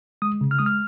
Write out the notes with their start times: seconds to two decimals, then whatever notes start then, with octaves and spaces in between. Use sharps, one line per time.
0.22 G#3 D#6
0.41 C#3
0.51 F6
0.59 G#3 D#6
0.66 F6